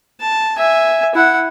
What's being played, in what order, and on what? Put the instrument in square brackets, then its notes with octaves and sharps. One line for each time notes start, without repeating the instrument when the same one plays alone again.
[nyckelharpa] A5
E5 G#5
E4 F#5